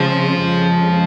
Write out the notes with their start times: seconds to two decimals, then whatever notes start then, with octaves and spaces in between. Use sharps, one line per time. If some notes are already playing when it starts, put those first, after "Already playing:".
Already playing: C#3 F3 G#3 C4 F4
0.41 F2 C#3 G#3